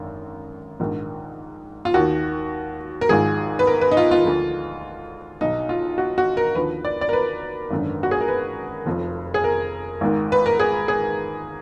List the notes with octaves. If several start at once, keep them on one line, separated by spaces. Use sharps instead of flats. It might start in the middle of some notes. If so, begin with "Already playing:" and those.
Already playing: G#1 F#2 D3
A#1 G#2 D#3
F4
D#2 F#4
D#3
A#4
G#1 G#2 F3 G#4
B4
A#4
B4
D#4
F4
F4
D2 D3 F3
B1 B2 D#4
F4
F#4
F#4
A#4
D#2 D3 F3 B4
D5
D5
A#4
B4
G#1 F#2 D3
F#4
G#4
A#4
B4
F1 F2 F3
G#4
A#4
G#1 G#2 D#3
B4
A#4
G#4
G#4